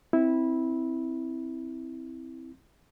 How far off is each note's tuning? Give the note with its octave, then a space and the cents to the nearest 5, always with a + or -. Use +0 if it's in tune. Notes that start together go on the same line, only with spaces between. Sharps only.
C4 +0 E4 -15